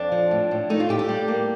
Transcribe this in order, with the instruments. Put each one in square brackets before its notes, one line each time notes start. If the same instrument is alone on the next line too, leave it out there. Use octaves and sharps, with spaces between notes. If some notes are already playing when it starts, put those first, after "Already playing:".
Already playing: [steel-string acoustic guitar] F2 D4
F3
A2
A2
A3 D#4
F4
A2 G4
G4
G3
A#3